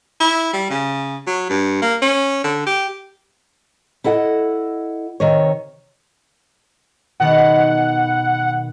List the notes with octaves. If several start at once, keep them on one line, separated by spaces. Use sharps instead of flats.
E4
G3
C#3
F#3
G2
A#3
C#4
D3
G4
E4 A4 D#5 F#5
C3 D#3 C#5
B2 D#3 B3 F#5